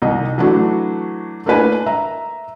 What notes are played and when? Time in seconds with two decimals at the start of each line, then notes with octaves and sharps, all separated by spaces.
0.02 C2 D#3 D#5
0.38 E3 F#3 A3 D4 F#4
1.46 A3 A#3 D4 E4 B4 G#5
1.86 E5 A#5